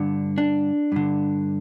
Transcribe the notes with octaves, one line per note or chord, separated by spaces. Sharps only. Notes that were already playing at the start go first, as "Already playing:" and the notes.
Already playing: G2 D3
D4
G2 D3